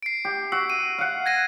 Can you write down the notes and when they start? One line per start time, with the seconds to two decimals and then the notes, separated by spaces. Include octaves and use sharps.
0.03 C7 D7
0.25 G4
0.52 F#4 E6 C7
0.70 D#7
0.98 F5 F#5
1.26 G#6 A#6 D#7